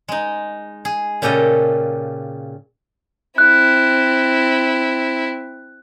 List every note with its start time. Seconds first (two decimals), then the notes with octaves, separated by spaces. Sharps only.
0.08 G#3 D#4
0.85 G#4
1.22 A#2 C#3 G4 A4 D#5
3.38 C4 E4 F#6